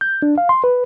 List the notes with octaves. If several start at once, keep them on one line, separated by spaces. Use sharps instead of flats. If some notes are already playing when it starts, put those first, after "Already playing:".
G6
D4
F5
C6
B4